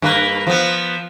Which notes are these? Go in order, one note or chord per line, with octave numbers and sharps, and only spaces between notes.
G2 A#3 B4
F3 B3